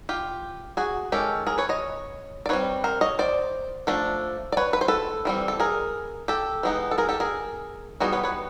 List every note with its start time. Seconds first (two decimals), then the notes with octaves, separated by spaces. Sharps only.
0.09 F4 G4
0.77 F#4 G#4
1.12 D#3 G#3 C#4 G4 A4
1.47 G#4 A#4
1.58 B4 C#5
1.69 C#5 D#5
2.46 D5
2.49 G3 C4 D#4 B4 C#5
2.84 A#4 C5
3.01 C#5 D#5
3.19 C5 D5
3.87 F3 A3 D4
4.52 D5
4.57 B4 C#5
4.73 B4
4.81 C5
4.88 A4 B4
5.25 E3 G3 C4
5.48 A4
5.60 G#4 A#4
6.28 G4 A4
6.63 E3 G#3 B3 D#4
6.91 A4
6.98 G#4 A#4
7.09 G4 A4
7.20 G#4 A#4
8.00 E3 G3 B3 D#4 F#4 G#4
8.12 B4 C#5
8.24 B4 C#5